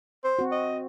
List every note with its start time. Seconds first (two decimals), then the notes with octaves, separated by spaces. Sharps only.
0.24 C5
0.39 C4 F#4
0.52 D#5